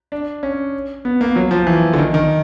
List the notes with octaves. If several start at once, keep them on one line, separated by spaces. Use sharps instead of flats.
D4
C#4
B3
A#3
F#3
F3
E3
D3
D#3
D#3